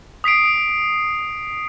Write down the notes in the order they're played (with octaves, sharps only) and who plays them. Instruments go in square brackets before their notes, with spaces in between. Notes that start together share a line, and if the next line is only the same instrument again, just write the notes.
[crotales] D#6 B6 C7 D7